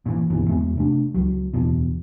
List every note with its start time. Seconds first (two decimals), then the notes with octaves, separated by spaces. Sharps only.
0.06 A#2 C#3 E3
0.30 G1 C#2 B2 E3
0.49 E2 G#3 B3
0.75 C3 A3 D4
1.14 C#2 F#3
1.53 D1 E2 B2